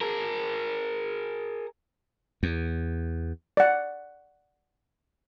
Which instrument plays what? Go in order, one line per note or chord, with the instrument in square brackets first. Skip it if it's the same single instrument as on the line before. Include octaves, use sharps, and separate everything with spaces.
[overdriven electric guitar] G#4 A#4
[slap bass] E2
[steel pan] D5 F#5